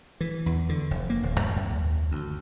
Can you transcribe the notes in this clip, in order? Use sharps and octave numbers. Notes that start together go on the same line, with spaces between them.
E3
E2
D3
F1
A#3
D#1
F#2
F#2
D#2
D2